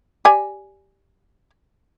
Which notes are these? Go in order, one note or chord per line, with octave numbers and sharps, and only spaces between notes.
G4 D5 G#5